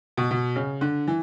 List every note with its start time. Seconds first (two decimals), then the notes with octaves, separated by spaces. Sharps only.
0.17 B2
0.31 B2
0.56 C#3
0.81 D3
1.07 E3